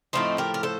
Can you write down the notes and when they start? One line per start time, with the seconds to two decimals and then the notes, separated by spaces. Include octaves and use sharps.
0.13 A2 F3 A3 C4 D#4
0.38 G4 A#4
0.54 A#4
0.63 A4 C5